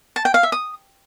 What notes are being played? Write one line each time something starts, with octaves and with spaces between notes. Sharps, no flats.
A5
G5
F5
E5
D#6